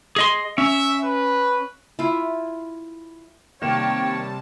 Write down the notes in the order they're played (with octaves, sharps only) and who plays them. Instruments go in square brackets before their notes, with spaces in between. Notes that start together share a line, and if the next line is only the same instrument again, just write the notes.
[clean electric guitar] G#4 D#5 C6
[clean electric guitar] C#4 [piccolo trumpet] E5
[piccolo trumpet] B4
[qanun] E4 F4
[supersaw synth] C3 G3 A5 [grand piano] D#3 A#3 E7 [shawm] C#5 [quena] G5